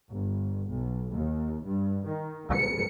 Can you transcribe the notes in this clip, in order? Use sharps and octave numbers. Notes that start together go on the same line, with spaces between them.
G1
B1
D#2
G2
D#3
C#7